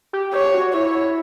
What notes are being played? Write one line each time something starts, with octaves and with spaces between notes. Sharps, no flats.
G4
G4 C#5
F#4
E4 C#5